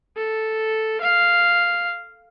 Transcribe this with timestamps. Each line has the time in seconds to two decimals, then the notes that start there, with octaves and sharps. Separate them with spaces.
0.17 A4
1.01 F5